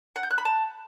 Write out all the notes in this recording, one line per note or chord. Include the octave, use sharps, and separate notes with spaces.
F#5
G6
F#6
B5
A5